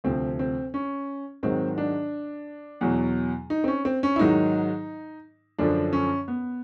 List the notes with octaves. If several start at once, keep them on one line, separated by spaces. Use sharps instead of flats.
D2 C3 F3 C4
C4
C#4
G#2 D#3 F#3 C4
D4
E2 B2 F#3
D#4
C4
C#4
C4
C#4
E4
G#2 D#3 F#3 D#4
F#2 D3 F3 D4
C#4
B3